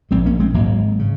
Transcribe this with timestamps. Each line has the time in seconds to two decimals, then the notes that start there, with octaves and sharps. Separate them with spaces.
0.11 A#1 G#2 G#3 C4
0.26 A#3 C#4
0.39 G#3 C4
0.54 G#1 G#2 F#3 A#3
0.99 C#3